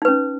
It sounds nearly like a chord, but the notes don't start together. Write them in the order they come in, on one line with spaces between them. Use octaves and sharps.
D#4 B4 C#4